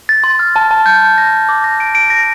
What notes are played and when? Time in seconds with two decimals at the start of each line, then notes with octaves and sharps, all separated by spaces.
0.09 A6
0.24 C6
0.39 F6
0.56 A5
0.71 A5
0.86 G6
1.02 G6
1.18 A#6
1.33 A#6
1.49 D6
1.64 A#6
1.80 D7
1.95 D7
2.10 A#6